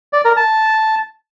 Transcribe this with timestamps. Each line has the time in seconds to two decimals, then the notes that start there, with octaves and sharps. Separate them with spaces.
0.13 D5
0.25 A#4
0.37 A5